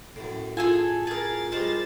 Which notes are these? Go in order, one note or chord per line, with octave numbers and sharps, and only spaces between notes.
F#2 A2
F4 G#4 A4 G#5
G#4 A#4 A6
G3 G#3 A#4 C5